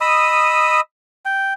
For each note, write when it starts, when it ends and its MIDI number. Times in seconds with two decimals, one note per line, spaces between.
0.01 0.80 75
0.01 0.80 83
0.01 0.80 87
0.01 0.80 88
1.25 1.53 79